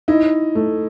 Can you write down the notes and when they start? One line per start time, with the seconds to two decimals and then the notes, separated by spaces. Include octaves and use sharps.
0.08 D#4 E4
0.55 A3